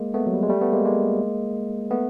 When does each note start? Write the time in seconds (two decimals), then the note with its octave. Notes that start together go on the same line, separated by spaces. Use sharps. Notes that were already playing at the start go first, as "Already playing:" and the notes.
Already playing: G#3 A#3
0.14 A3 B3
0.27 F#3
0.34 G3
0.43 G#3
0.49 G3 A3
0.61 A3 B3
0.73 G#3 A#3
0.85 G#3 A#3
1.91 A3 B3